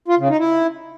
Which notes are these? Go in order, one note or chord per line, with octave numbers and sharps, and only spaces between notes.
F4
C#3
D#4
E4